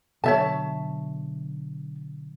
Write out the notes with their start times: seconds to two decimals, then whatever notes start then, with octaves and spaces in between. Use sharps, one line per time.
0.24 B2 D3 F#3 C#5 E5 A5